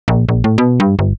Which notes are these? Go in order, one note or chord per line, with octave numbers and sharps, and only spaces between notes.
A#1
A#1
A2
B2
G2
G1